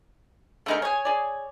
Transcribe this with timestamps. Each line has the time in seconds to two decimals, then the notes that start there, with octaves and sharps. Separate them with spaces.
0.66 D3 G#3 A3 B3 D#4 A#4
0.82 G#4 C#5 G#5
1.05 G#4 D5